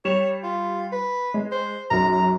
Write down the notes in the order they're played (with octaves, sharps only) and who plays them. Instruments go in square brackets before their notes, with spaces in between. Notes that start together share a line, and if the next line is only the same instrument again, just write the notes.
[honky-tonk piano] G3 E7 F7 [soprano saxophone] C#5
[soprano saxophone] F4
B4
[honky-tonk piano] G#3
[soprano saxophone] C5
[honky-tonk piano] B1 F#2 [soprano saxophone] A#5